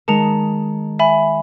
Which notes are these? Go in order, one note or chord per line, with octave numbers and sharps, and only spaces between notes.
D#3 G#3 A#4 A5 C#7 F7
E5 G#5 B5